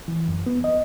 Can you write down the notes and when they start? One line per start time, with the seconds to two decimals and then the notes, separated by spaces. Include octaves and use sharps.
0.08 E3
0.28 F#2
0.46 B3
0.64 D#5